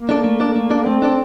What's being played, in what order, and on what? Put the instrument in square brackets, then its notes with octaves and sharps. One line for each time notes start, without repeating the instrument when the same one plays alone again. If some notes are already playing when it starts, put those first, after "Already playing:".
Already playing: [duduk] A#3
[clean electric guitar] D4 A4 D5
A3
D4 A4 D5
A3
D4 A4 D5
[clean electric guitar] A3 [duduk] C4
[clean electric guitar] D4 A4 D5